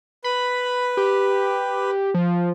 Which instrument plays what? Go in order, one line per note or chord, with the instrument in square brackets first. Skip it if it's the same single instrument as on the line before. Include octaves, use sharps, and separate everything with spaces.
[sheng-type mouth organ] B4 [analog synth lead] B5
[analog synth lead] G4
F3